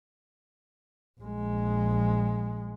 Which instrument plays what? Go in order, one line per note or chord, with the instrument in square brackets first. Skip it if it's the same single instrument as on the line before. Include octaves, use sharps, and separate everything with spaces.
[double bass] A#1 G#3